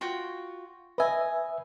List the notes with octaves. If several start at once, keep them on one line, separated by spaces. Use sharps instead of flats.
F4 F#4 G5
B4 D#5 E5 G#5